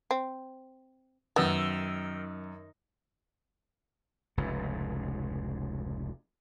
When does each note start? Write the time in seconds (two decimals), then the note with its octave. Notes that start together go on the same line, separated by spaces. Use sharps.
0.11 C4
1.36 F#2 D#3 B3 E6 A6
4.37 F1 C#2 G#2